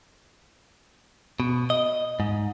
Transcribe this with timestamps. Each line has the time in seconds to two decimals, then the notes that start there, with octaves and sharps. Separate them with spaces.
1.40 B2
1.70 D#5
2.20 G#2